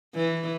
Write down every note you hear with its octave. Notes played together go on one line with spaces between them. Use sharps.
E3